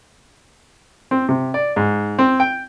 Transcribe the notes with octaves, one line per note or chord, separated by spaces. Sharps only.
C4
C3
D5
G#2
C4
G5